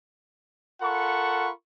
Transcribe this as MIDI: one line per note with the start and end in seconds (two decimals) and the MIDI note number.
0.82 1.50 65
0.82 1.50 69
0.82 1.50 70
0.82 1.50 78
0.82 1.50 83
0.82 1.50 85